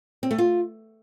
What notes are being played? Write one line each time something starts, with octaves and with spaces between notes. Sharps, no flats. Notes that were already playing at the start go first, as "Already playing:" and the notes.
C4
A3
F4